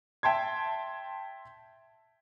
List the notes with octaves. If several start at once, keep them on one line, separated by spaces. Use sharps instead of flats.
E5 G5 A5 C6 G#6